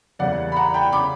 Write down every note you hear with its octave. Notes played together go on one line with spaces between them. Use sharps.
E2 C#3 E3 G3 A#3 D5 F#5
B5
F#5 A#5
G5 B5
C#3 B5 D6